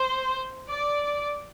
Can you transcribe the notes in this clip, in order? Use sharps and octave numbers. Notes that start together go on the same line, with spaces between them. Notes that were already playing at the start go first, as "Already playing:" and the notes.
Already playing: C5
D5